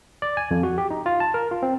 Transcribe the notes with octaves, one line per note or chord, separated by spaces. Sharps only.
D5
G#5
F2
F#4
G4
D#4
F4
A5
A#4
F4
C4